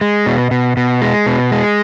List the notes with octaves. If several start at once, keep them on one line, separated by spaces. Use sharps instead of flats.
G#3
B2
B2
B2
G#3
B2
G#3